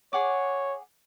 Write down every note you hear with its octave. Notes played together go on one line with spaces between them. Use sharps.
G#4 C#5 F#5 D6